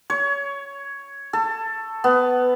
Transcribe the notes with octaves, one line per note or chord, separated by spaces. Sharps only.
C#5
A4
B3